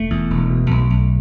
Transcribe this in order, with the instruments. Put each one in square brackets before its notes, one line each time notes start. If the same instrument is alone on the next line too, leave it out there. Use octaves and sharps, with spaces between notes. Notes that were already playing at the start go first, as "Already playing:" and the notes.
Already playing: [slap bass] E1 A3
E2
E1
B2
B1
B1